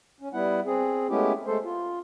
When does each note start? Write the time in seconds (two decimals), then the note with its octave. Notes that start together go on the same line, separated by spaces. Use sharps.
0.20 C#4
0.33 G3 B3 E4 F#5
0.66 C4 G#4
1.10 G#3 A3 B3 C#4 E4 G4
1.47 G#3 A3 A4 C5
1.64 F4